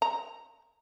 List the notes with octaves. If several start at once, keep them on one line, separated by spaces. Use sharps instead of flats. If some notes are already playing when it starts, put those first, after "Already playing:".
A#5